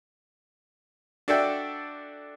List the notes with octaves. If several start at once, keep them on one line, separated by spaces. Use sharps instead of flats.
D4 F#4 A4 D5 E5 G5